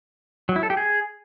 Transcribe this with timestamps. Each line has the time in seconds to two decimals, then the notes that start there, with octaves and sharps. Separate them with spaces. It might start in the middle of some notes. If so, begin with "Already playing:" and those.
0.49 F#3
0.56 E4
0.63 A4
0.70 G4
0.77 G#4